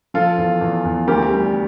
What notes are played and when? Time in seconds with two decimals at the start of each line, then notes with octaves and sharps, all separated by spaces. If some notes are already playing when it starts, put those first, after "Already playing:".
0.14 F3 F4 A4
0.38 E2
0.61 E2
0.85 E2
1.08 D2 G4 A#4
1.31 G3